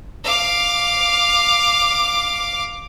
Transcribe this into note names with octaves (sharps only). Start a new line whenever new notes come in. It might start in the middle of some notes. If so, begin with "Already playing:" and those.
F5 D6